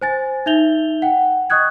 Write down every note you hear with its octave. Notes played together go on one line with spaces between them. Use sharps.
C5 G#5 A6
D#4 E5 G6 F7 G7
F#5 G5
D#5 C#6 D#6 F#6 G#6